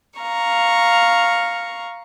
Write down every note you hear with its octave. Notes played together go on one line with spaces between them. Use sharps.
F5 A#5 C#6